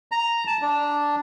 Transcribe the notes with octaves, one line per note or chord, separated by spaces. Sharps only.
A#5
A5
D4